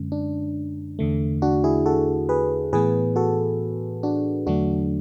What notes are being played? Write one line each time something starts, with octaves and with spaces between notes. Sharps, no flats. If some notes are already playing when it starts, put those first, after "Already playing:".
Already playing: F#2 D3 G#3 C#4
D4
E2 D3 A3
D4 F#4
E4 G#4
F#4 A4
G#4 B4
A2 E3 B3 G#4 B4
F#4 A4
D4 F#4
E2 D3 F#3 A3 D4 F#4